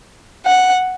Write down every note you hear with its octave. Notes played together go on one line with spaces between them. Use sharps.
F#5